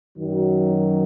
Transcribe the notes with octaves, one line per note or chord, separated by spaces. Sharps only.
F#2 D#3 F#3